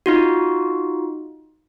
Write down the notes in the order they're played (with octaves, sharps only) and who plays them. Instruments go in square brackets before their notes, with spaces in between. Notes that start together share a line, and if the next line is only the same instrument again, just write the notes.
[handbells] D#4 F4 F#4